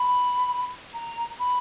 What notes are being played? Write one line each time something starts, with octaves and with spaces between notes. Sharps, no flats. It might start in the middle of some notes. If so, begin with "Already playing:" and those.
Already playing: B5
A#5
B5